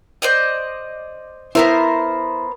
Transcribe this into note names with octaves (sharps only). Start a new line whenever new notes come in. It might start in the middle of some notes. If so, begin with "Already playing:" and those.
C5 D5 D#5
B3 E4 A#4 C5